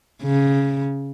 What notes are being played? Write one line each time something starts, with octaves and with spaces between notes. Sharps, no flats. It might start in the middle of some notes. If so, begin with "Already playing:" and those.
C#3